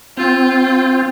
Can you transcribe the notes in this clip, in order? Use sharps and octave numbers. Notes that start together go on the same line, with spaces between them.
C4 F4